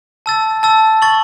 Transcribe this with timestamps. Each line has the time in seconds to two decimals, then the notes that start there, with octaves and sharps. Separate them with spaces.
0.26 A5 E6 A6
0.63 A5 E6 A6
1.02 C#6 A6 F#7